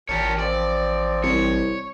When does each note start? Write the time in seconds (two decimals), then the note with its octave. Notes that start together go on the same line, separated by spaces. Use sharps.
0.09 A1 A#2 G4 A#4 C#5 A5
0.39 F3 C4 D5
1.24 C2 C#5